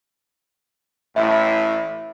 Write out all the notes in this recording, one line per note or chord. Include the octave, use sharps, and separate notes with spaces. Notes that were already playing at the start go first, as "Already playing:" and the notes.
A1 A2 E4 E5